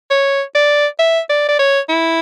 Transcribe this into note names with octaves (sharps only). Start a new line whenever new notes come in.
C#5
D5
E5
D5
D5
C#5
E4